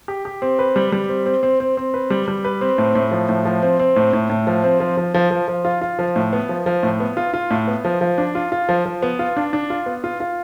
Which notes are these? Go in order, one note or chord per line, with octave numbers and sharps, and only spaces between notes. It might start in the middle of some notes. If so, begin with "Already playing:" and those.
G4
G4
C4
B4
G3
G3
C4
C4
C4
C4
C4
B4
G3
G3
B4
C4
A2
A2
F3
A2
F3
C4
C4
A2
A2
A2
F3
C4
F3
F3
F3
F3
F3
F4
F4
F3
A2
B3
F3
F3
A2
B3
F4
F4
A2
B3
F3
F3
D4
F4
F4
F3
F3
B3
F4
D4
D4
F4
B3
F4
F4